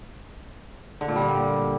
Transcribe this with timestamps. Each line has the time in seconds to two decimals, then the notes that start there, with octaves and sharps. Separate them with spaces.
1.01 D3
1.08 A#2
1.16 G3